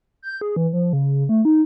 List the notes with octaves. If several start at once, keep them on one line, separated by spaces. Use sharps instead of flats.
G6
G#4
E3
F3
C#3
A3
D#4